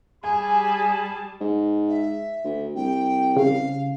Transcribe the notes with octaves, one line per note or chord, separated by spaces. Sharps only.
G3 G#4 G#5 A5 B5
G#2
E5
D2
C2 G5
C#3 F5